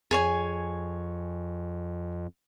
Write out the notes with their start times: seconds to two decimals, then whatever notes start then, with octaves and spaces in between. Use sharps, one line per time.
0.11 F2 G#4 C#5 G#5